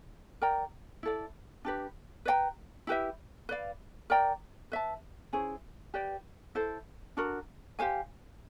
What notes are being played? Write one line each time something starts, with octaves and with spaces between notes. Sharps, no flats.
A#4 D5 G5 A#5
E4 A4 D5
D4 G4 B4
B4 D5 G5 A#5
E4 G4 B4 E5
B4 D5 F5
A#4 D5 G5 A#5
B4 E5 A5
C#4 E4 G#4 C5
G4 B4 D5 G5
E4 A4 C5
D4 F#4 A#4
G4 C5 F5 G#5